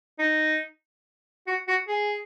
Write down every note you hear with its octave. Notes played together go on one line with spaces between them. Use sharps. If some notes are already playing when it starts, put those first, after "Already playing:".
D#4
F#4
F#4
G#4